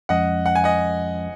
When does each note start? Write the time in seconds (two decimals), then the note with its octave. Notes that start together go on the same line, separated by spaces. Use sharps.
0.09 F2 F3 G#3 C#4 D#5 F#5
0.46 F#5
0.55 G#5
0.64 D#5 F#5